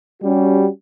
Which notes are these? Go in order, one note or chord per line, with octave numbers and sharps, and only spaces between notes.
G3 C#4 F#4 G4